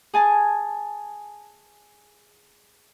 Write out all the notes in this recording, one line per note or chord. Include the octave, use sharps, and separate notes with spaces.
G#4 G#5 A5